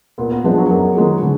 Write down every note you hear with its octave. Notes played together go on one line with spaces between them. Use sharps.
A#2 B3
B3
F3 G#3 B3 D4
F#3
F#2 F#3
D#3 G#3 D#4 G#4
D3